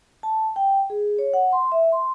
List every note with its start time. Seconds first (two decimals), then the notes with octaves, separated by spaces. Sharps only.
0.23 A5
0.56 G5
0.90 G#4
1.19 C#5
1.34 F#5
1.53 C6
1.72 E5
1.92 C6